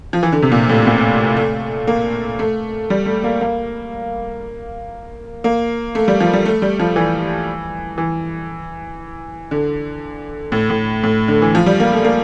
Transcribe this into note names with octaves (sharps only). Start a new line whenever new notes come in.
F3
E3
D3
C3
A#2
A2
A#2
A3
A#3
A3
G3
A3
A#3
A#3
A#3
A3
G3
F3
G3
A3
G3
F3
E3
E3
D3
A2
A2
A2
D3
E3
F3
G3
A#3
A3
A#3